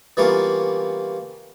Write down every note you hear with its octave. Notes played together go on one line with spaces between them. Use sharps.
E3 G3 A#3 B3 C#4 F4